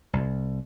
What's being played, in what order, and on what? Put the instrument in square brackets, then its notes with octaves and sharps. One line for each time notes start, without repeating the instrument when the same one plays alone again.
[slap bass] C2